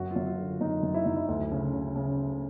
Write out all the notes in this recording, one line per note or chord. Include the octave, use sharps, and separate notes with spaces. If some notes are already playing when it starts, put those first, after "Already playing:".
Already playing: F#2 F#4
F4
F#2
F4
D3
F#2 D#4
F#2
E4
F#2 D#4
E4
D2 E4
C#3
C#3
C#3